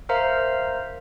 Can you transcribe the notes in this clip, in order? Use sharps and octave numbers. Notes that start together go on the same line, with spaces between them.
A#4 C5 E5 F5 A#5